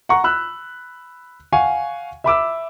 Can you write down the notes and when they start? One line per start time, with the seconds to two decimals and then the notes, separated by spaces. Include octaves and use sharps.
0.09 F#5 A#5 C#6
0.24 B5 E6 F#6
1.52 F5 F#5 G#5 C#6
2.24 E5 B5 D6 E6